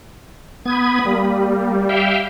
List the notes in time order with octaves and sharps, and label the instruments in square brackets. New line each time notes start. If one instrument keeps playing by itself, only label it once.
[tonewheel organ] B3 G#6 [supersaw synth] B5 D#6
[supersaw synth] G3 [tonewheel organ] A#3
[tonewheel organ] E5 F5 G5